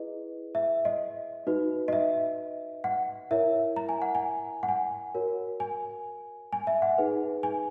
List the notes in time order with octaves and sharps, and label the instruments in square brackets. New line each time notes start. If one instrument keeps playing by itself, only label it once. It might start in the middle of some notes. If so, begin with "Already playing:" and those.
Already playing: [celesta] E4 G#4 B4 D#5
E5
D#5
D#4 F#4 B4
D#5
E5
F#5
E4 A#4 C#5 E5
A#5
G#5
F#5
G#5
F#5
G#5
F#4 A#4 C#5
G#5
G#5
E5
F#5
D#4 G#4 B4
G#5